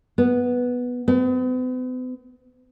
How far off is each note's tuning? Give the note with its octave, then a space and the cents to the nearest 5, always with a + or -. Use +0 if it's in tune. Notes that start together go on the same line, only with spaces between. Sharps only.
B3 -5
B3 +45